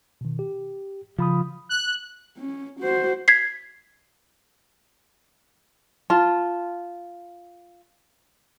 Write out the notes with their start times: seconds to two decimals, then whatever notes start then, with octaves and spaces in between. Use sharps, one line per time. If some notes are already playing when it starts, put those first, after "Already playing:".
0.21 B2 D#3
0.39 G4
1.19 C#3 F3 B5 D#6
1.69 F#6
2.37 C#4
2.80 F#4 C5
3.28 G#6 B6 C7
6.10 F4 A5